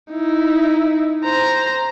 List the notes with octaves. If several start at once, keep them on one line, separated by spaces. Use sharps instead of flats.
D#4 E4
C5 A#5